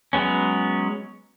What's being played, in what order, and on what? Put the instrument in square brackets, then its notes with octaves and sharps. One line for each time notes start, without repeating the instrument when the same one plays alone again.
[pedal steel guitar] F#3 G#3 B3 C#4